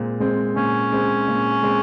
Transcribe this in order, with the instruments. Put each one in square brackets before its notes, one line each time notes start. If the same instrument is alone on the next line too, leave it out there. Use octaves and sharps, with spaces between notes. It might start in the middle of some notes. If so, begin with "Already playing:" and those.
Already playing: [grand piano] A#2 G#3 C4
G#3 C4
[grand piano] A#2 [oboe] C#4
[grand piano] G#3 C4
A#2
G#3 C4